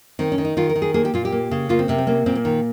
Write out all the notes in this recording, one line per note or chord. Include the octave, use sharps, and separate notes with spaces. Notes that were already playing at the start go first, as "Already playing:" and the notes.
D#3 C4
C#4
D#3
D#4
D#3 F4
A#4
D#3
G#4
A#3 G#4
G4
A#2 F4
G4
A#3
C#3
A#3 F4
C4
C3 A#3
C4
A#3 C#4
A#2 C4
A#3
D#3